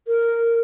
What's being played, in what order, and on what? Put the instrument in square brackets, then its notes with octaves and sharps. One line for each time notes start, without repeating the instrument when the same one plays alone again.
[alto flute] A#4